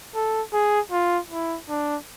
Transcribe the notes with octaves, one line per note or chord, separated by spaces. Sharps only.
A4
G#4
F4
E4
D4